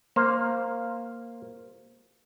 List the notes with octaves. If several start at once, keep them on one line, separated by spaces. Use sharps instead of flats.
A#3 C5 F5